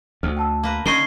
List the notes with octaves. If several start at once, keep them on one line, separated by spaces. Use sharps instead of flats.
D2 A4 C5 F6
G5 A5 E6
A#3 B4
D3 C#4 D#4 C#5 C#6 C7 G7